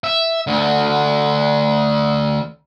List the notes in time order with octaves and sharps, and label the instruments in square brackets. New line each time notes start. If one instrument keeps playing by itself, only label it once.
[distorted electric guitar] E5
D2 D3